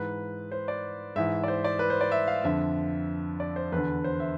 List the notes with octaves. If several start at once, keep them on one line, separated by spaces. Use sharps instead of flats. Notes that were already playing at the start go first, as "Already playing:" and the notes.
Already playing: G#2 E3 B4
C5
D5
G#2 E3 E5
D5
C5
D5
B4
C5
D5
E5
F5
F2 D3 E5
D5
C5
E2 D3 B4
C5
E5